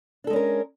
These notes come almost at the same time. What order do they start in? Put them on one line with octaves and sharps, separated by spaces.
D4 A4 G#3 C#4 A#4